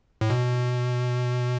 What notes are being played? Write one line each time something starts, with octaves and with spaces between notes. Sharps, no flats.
A2
B2